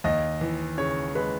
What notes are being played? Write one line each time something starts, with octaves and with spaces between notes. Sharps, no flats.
D#2 D#5
E3
C#3 C#5
G#3 B4